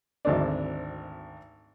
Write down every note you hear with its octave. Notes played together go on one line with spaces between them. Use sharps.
G#1 D2 C4 D4